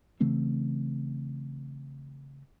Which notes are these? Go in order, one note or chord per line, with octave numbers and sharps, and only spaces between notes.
C#3 E3 A3 C4